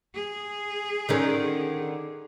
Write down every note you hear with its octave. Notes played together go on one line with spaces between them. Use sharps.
G#4
D3 D#3 C#4